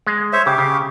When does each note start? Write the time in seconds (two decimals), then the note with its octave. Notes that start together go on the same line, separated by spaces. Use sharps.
0.07 G#3
0.33 C5 C#5 E5
0.46 C#3 G4
0.58 C#3